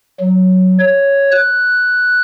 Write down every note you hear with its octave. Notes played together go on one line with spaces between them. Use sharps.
F#3
C#5
F#6